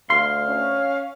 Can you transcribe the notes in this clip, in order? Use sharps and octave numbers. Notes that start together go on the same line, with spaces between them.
D2 F5 C6
C#4 C#5